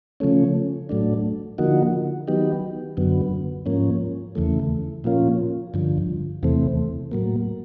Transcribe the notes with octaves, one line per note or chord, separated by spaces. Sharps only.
C#3 F3 A3 C#4
A2 F#3 A3 D4
D3 F3 A#3 D#4 F#4
D#3 F#3 B3 D#4 G4
F#2 D3 F#3 B3
G#2 F3 A#3 C#4
E2 C#3 E3 A3
A#2 F3 A#3 C#4 F4
G2 D3 F3
E2 C3 E3 A3 C4
A2 F#3 A#3